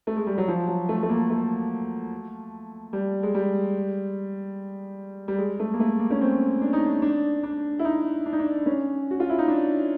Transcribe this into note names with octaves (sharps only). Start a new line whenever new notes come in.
A3
G#3
G3
F#3
F3
F#3
A3
A3
A#3
A3
G3
G#3
G3
G3
G#3
A3
A#3
A3
A#3
C#4
C4
D4
D#4
D4
D4
D4
E4
D#4
D4
D#4
D4
C#4
F#4
F4
E4
D#4
D4